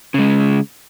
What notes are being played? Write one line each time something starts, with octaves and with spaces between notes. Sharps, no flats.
C#3 G#3